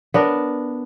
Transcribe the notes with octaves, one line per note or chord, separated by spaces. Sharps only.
B3 D4 A#4